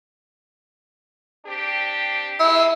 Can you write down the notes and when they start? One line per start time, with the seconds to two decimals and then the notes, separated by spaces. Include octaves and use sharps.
1.45 C4 D4 G4
2.40 C3 F3 G#3 E4